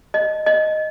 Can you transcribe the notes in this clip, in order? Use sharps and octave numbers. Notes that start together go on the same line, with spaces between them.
D#5
D#5